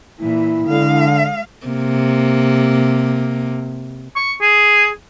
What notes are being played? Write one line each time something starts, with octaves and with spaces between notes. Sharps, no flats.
A#2 E3 E4
D3 G#3 F5
C3 A#3
C#6
G#4